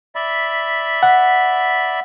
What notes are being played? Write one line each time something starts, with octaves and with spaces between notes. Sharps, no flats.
D5 E5 B5
F#5